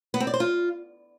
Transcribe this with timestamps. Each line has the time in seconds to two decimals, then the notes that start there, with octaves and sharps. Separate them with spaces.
0.14 B3
0.20 C4
0.27 D5
0.34 C5
0.40 F4